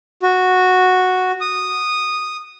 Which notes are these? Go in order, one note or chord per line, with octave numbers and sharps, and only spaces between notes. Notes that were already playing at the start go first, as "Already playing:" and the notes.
F#4
D#6